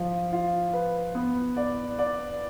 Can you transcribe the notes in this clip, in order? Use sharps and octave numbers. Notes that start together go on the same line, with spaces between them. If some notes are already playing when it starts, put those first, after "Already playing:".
Already playing: F3 F4
F4
B4
B3
D5
D5